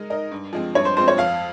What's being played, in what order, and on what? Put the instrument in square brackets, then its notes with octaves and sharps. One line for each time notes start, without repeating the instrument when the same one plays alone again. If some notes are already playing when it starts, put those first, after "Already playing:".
Already playing: [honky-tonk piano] G#3 D#4 A#4 D#5
D#4 A#4 D#5
G2
F3 G#3 C4
[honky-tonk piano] G2 [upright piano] C#5
[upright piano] C5
[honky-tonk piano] F3 G#3 C4 [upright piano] C5
[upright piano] C#5
[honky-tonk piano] F2 [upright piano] F5